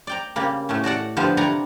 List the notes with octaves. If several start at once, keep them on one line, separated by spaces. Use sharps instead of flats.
D5 G5 A#5
C#3 G3 A#3
A2 A3 C#4
F#4 A4 D5 F#5
D3 F3 B3 G4 E5 F5
C3 G3 D5 F#5 G#5 A#5